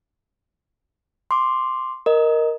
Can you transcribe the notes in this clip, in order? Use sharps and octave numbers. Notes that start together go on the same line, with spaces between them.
C6 D6
A#4 D#5